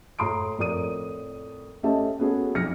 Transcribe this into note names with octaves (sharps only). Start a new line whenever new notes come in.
A2 A#5 C6 D#6 D7
F2 A2 A#4 D5 D#6 D#7
A3 C#4 G4 D#5 E5 A5
B3 C#4 F#4 G#4 A4
B1 F2 F6 A#6 C#7